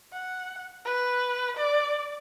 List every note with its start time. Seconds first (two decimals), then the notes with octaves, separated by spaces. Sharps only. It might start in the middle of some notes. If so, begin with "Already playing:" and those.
0.12 F#5
0.85 B4
1.56 D5